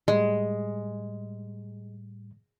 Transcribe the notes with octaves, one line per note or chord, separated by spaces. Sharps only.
A2 G3 G#3